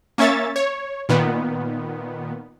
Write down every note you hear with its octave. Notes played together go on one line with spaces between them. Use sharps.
A#3 C#4 C#5 E5 A6
C#5
A#2 D#3 B3